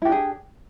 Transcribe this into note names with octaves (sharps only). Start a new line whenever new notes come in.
D4 E4 G4 G#4